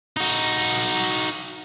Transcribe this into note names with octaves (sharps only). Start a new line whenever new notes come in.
D#4 F#4